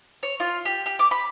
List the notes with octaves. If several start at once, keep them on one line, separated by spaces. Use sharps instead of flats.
C#5
F4
G4
G4
D6
B5